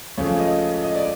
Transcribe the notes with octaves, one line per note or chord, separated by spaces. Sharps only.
C#2 C#3 F3 A3 C#5
D#5
D#5
D5